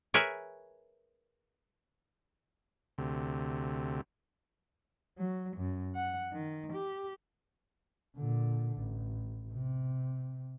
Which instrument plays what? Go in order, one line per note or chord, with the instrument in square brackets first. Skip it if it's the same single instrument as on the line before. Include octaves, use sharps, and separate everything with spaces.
[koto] G#4 A#4 B4 C#5 E5 G#5
[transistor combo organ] D2 C3
[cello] F#3
F#2
F#5
D#3
G4
[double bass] A#2 D3
A1
C3